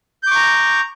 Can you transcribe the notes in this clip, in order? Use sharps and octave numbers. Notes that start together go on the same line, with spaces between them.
A#5 C#6 D6 G6